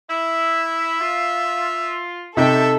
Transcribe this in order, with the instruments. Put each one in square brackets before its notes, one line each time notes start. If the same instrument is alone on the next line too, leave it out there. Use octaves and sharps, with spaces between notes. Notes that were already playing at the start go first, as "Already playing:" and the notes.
[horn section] E4 [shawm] E5
[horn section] F4
[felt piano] C3 D#4 [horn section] C#4 G5 [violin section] A4 [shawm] E5